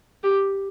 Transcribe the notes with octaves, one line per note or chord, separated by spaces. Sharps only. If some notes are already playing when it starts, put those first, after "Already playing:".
G4